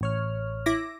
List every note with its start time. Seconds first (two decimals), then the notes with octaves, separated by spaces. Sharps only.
0.01 A1 C#5 F6
0.66 E4 D6 A#6